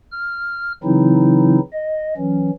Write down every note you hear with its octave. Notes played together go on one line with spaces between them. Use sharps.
F6
C#3 E3 F#3 C4 D#4 E4
D#5
E3 F#3 C#4